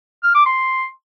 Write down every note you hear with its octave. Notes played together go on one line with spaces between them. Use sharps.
F6
D6
C6